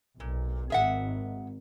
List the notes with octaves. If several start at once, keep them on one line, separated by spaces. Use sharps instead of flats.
B1 A#2
G#1 G#4 E5 F#5